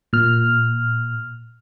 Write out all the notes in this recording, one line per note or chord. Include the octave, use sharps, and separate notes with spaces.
A#2 F6